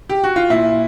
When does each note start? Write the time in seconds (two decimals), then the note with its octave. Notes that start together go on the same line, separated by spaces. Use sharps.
0.09 G4
0.24 F#4
0.36 F4
0.50 A#2 E4